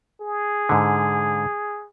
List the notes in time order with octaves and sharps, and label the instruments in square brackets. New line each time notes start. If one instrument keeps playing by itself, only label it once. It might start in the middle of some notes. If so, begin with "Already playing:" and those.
[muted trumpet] G#4
[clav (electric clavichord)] G#2 D3